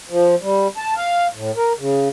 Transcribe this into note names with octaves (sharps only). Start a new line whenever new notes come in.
F3
G3
A5
F5
A2
A#4
C#3